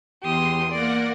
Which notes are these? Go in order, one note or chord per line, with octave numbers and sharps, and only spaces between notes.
E2 G4 C6 D#6
A#3 A#4 D5 F#5